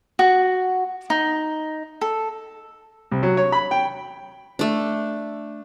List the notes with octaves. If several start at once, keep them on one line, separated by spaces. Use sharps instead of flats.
F#4
D#4
A4
C2
F#3
C#5
B5
G5
A3 D4